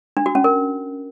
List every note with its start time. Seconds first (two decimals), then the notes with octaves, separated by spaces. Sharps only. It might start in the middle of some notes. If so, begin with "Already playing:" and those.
0.17 D4
0.26 F#4
0.35 C#4
0.44 A#4